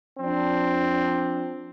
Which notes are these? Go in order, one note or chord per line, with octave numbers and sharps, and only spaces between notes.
F3 C4 D4